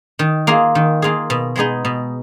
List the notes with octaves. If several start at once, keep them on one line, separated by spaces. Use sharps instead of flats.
D#3
A#3 F4 G#4
D#3
A#3 F4 G#4
B2
G#3 B3 D#4 G#4
B2